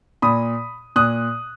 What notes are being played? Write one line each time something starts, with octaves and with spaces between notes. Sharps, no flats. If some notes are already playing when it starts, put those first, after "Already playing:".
A#2 B5 D#6
A#2 D#6 F#6